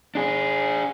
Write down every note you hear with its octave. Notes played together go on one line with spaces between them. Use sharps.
D4 G#4